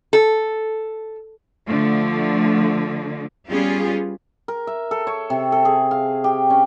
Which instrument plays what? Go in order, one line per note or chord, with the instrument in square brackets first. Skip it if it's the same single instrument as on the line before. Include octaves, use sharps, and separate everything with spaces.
[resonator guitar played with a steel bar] A4
[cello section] D3 F3 A3
G3 B3 C#4 F4 G4 G#4
[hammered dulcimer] A#4
E5
A4
C#5
C3
A4
G#4
F5
G4
C#4